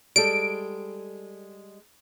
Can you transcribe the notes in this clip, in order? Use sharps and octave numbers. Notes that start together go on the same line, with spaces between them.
G3 G#3 A4 D7